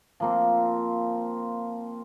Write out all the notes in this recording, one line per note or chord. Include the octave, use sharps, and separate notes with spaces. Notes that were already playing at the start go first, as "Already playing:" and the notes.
F3 A#3 C4